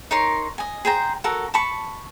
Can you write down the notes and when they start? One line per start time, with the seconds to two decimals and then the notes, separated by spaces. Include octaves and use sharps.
0.11 D#4 A#4 C#5 C6
0.58 D#5 G#5
0.85 G#4 C5 G5 A#5
1.24 F#4 A4 A#4 F#5
1.54 A5 B5 C#6